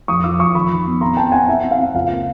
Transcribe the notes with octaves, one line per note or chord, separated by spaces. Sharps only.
F2 C#6 D#6
F3 D6 E6
F2 C#6 D#6
D#3 B5 C#6
D#3
B3
C4 A#5 C6
C4 G5 A5
C4 F#5 G#5
C4 E5 F#5
C4
F5
C4
C#2 F5
A#3